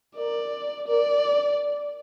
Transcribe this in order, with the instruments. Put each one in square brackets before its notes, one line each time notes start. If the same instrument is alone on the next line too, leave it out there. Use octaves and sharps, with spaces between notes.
[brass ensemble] A#4 [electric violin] D5
[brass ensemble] A#4 [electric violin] D5